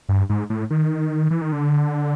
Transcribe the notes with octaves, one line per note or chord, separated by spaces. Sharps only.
G2
G#2
A2
D#3
E3
D#3
D3